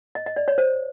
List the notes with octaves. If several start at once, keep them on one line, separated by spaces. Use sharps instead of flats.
D#5
D#5
D5
C#5
C5